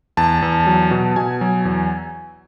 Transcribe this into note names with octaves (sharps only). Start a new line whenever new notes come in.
E2 A5
E2
F#3
B2
A5
B2 G#5
F#3
E2